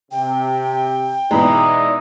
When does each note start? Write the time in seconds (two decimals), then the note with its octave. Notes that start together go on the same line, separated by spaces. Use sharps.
0.11 C3 G5
1.31 B2 E3 G#3 D#4 E4 D5 A#5 B5